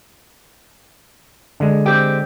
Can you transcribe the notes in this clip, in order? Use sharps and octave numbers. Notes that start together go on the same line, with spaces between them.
D3 G#3
C4 G4